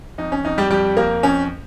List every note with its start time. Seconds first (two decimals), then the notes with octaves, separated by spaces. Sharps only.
0.18 F2 D#4
0.32 C#4
0.44 F2 D#4
0.58 G3 G4
0.70 F2 G3 G4
0.97 F2 A#3 A#4
1.23 F2 C#4